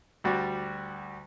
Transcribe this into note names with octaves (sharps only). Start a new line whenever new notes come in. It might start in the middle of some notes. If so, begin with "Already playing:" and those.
D2 G3 F#4 D5